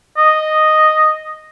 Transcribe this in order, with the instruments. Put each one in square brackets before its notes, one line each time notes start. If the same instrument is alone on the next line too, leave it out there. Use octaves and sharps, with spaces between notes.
[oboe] D#5